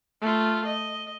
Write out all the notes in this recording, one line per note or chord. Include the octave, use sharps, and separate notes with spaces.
A3 F4
D#5